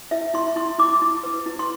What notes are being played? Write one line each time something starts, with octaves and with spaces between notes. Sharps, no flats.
E4 E5
E4 C6
E4 C6
E4 D6
E4
B4
E4
C6